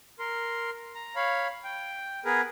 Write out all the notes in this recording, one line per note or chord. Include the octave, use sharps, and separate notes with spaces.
A#4 C6
A#5
C#5 F5 B5
G5
B3 G#4 A#4 B4